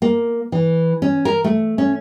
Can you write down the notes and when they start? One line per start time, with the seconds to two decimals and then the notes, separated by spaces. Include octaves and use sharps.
0.02 A#3
0.52 E3
1.02 C#4
1.25 A#4
1.44 A3
1.78 C#4